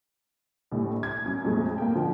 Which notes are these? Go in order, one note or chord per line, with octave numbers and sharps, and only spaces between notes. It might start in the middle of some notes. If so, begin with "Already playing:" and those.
A#1 A2 G3
G#6
F#2
F2 A#2 G#3 A3
A#3 G5
D3 F3